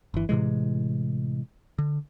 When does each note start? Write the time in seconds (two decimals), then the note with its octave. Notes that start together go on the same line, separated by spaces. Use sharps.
0.14 G1 E3
0.29 A2 C3 E3 G#3
1.79 D3